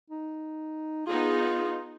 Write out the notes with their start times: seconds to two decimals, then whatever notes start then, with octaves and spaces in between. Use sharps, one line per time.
0.10 D#4
1.07 B3 D#4 F4 G#4